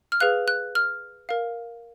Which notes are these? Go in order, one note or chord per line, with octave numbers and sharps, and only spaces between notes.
F6
G#4 B4 F5 F#6
F#6
F6
A#4 F5